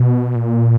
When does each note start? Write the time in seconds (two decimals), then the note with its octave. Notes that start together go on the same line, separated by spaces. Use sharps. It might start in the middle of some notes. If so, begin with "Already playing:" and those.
Already playing: B2
0.35 A#2